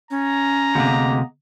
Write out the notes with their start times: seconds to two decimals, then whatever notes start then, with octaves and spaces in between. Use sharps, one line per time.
0.11 C#4 A#5
0.75 D2 C3 G#3 A#3 B3